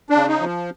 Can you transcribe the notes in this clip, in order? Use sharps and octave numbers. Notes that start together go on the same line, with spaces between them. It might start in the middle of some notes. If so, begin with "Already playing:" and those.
D4
C#3
D#4
F3